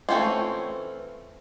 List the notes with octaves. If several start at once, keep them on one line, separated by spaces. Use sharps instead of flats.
E3 A3 C4 C#4 F4